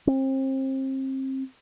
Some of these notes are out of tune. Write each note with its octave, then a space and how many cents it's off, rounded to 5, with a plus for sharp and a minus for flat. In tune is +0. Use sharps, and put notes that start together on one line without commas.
C4 +30